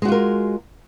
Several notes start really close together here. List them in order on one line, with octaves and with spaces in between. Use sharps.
G#3 F#4 F4 A#4